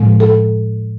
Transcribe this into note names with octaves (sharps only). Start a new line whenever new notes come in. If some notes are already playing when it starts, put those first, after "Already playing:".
Already playing: A2 F3 G#3
A4